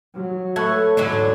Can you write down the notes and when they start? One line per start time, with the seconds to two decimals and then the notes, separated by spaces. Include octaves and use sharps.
0.14 F#3
0.56 A3 A4 B4 C#5 C#6 F#6 G#6
0.97 E2 G#2 D3 F#3